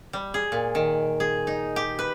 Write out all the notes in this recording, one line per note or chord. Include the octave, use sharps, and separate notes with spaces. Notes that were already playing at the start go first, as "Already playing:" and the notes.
G3
G#4
A#2
D#3
G#4
D#4
G4
B4